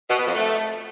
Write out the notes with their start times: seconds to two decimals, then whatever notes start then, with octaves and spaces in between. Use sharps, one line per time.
0.09 B2
0.17 B3
0.26 F2
0.35 A3